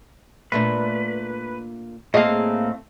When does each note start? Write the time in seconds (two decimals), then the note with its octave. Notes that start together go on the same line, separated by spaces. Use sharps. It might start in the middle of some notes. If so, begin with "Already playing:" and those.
0.52 A#2 A3 D4 B4
2.14 A2 A3 A#3 C4 G#4 D#5 F5